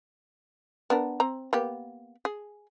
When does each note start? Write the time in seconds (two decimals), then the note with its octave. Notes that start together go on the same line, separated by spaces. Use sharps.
0.90 B3 D4 A#4
1.20 C4 A#5
1.53 A#3 B3 G4
2.25 G#4